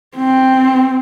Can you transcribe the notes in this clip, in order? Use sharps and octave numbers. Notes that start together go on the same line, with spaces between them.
C4